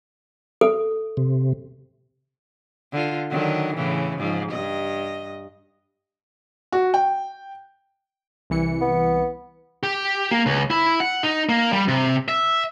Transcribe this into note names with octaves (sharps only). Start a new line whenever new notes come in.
A4
C3
D3 F4
D3 D#3 F#3
A2 C#3 E3
G#2 F3
G2 D#5
F#4
G5
C2 E3 C#7
B3
G4
A#3
C#2
E4
F#5
D#4
A#3
G3
C3
E5